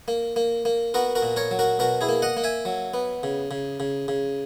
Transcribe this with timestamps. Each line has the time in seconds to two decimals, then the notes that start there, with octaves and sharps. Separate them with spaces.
0.08 A#3
0.36 A#3
0.65 A#3
0.94 B3 F#4 A#4
1.15 F#4 A#4
1.23 A#2
1.36 A#4 C#5
1.51 F#3
1.59 F#4 A#4
1.79 B2 F#4 A#4
2.01 E4 G#4
2.09 A#3
2.22 D#5 F#5
2.37 A#3
2.44 E5 G#5
2.65 F#3
2.94 B3
3.23 C#3
3.51 C#3
3.80 C#3
4.08 C#3